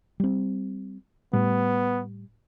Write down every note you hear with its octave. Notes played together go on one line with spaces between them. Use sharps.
G3 C4
A2 G3 B3